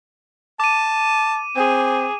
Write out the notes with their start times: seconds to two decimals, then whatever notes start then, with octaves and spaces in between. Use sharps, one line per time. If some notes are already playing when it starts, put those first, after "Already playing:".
0.60 A5 D6 D#7
1.56 C4 G#4